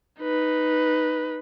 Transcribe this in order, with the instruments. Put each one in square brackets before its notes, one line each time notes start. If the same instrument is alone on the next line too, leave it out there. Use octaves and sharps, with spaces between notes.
[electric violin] D#4 B4